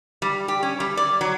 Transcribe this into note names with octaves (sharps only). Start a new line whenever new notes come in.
G3
G4
C#4
G3
D5
F#3